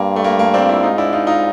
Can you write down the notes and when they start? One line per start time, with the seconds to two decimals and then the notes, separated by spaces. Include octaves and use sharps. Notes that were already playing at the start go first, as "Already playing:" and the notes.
Already playing: G2 A#3
0.16 A3
0.24 A#3
0.39 A#3
0.54 C4 D4
0.64 F4
0.69 D4 E4
0.83 G#2 D#4 F4
0.98 D4 E4
1.13 D#4 F4
1.27 D#4 F4